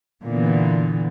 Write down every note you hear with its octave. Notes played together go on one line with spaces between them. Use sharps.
A#2 D3 E3 B3